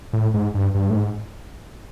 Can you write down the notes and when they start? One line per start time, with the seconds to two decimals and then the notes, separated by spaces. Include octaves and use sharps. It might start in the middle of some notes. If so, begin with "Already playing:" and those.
0.13 A2
0.34 G#2
0.54 G2
0.74 G2
0.90 A2
0.95 G#2